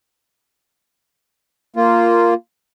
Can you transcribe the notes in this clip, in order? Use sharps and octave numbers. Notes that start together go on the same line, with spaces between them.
A#3 F4